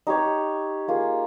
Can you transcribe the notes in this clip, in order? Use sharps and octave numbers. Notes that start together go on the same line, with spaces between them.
D#4 G4 C#5
A#3 F4 G#4